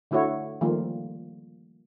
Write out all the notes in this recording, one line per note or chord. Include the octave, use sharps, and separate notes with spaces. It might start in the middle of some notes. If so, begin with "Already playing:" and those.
D3 A3 E4 F#4 C#5
D#3 F3 G3 A3 A#3 F4